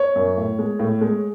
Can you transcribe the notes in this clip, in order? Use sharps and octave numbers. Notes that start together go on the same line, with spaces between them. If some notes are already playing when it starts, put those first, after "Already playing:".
Already playing: C#5
F#2
A2
G#3
A2
G#3